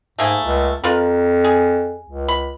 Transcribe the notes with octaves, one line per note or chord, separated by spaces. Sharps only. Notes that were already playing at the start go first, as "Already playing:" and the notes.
G#2 A3 A#3 G#4
C#2
F2 F4 A#4 B4
G#4
C#2
B5